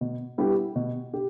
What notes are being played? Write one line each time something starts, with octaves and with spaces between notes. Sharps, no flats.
B2
G3 B3 E4 G4
B2
G4